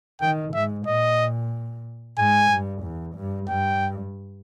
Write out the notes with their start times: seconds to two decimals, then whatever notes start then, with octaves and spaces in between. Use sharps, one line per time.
0.21 D#3 G5
0.54 G#2 E5
0.87 A#2 D#5
2.17 G#2 G#5
2.51 G2
2.83 E2
3.16 G2
3.49 G2 G5